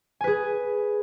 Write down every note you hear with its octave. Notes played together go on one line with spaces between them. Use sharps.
G#4 B4 G#5